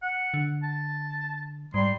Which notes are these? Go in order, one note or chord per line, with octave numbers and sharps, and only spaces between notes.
F#5
D3
A5
G#2 G3 C6